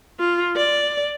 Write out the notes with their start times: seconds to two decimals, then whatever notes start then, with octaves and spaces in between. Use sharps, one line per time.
0.20 F4
0.56 D5